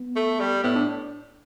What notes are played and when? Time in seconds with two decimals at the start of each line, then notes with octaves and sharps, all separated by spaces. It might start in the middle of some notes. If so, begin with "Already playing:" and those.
Already playing: B3
0.16 A3
0.40 G3
0.63 A2 B3
0.76 D4